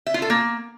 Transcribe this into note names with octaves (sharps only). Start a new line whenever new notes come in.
E5
F4
A4
A#3